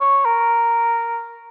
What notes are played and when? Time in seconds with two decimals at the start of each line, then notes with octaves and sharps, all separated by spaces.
0.01 C#5
0.25 A#4